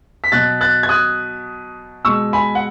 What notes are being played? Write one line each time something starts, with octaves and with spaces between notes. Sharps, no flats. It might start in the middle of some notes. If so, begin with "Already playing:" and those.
B6
B2 F#3 F#6 A6
F#6 A6
G#6
D#6 F#6
B2 G#3 C#6 E6
G#5 B5
F#5